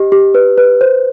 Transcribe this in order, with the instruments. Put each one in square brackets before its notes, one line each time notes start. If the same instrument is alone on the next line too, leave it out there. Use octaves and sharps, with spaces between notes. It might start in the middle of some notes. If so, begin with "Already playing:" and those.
Already playing: [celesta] G4 D#5
G4
B4
B4
C5